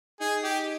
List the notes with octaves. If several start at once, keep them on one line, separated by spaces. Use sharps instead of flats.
D#4 G#4
G4